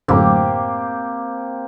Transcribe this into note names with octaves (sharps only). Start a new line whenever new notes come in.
F#2 A2 D3 A#3 C4 G4